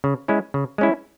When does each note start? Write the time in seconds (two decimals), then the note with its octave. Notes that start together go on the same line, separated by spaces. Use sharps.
0.04 C#3
0.28 G#3 C#4 E4
0.54 C#3
0.78 G#3 C#4 E4